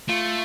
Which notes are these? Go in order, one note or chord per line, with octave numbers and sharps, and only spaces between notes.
A3 F4